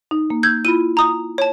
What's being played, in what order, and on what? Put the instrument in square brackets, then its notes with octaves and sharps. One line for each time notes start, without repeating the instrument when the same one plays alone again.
[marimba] D#4
A#3
[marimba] E6 [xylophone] G6 G#6
[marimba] E4 F4 B5 [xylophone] D#7
[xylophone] A#5 D#6
C#5 A5